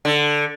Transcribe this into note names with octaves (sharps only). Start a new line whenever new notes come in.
D3